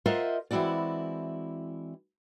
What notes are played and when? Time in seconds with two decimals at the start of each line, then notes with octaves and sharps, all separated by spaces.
0.06 F4 A#4 C5 D#5 E5 F#5
0.51 E3 G#3 C4 E4 F#4 D5